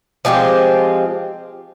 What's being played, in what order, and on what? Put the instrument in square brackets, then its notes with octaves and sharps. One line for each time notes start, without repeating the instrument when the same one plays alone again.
[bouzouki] F3 G#3 C4 G4